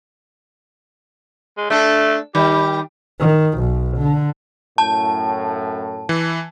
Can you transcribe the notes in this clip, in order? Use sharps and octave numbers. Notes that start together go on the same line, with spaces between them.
G#3
A3 D4 A4
D#3 G3 G4
D#3
B1
D3
F#2 A2 A5
E3